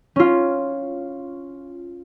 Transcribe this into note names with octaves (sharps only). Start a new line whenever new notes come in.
C#4 F4